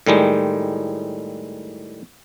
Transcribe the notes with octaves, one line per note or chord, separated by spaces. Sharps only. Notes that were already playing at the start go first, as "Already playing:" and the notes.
A2 D#3 G3 G#3